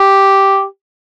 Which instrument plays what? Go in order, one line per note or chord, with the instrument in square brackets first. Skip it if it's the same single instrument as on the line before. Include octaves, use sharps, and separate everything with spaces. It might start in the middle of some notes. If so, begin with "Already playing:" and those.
Already playing: [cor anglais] G4